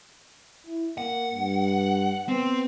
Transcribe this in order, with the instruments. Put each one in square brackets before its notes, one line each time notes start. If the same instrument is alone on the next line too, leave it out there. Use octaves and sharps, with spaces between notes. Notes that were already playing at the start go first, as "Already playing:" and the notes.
[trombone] E4
[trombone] A#3 [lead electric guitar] F#5
[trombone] G2
[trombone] B3 [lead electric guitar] C4